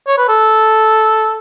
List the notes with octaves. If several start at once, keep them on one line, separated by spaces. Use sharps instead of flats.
C#5
B4
A4